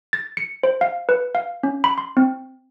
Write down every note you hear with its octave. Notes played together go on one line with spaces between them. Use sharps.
A6
C#7
C5
F5
B4
F5
C#4
B5
C6
C4